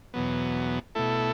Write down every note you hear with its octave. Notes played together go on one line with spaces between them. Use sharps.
E2 B2 F#3 B3
B2 A3 E4 A4